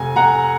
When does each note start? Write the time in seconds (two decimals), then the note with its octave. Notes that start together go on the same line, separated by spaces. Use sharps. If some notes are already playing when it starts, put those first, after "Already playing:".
Already playing: F1 G#5
0.16 F1 F#5 A#5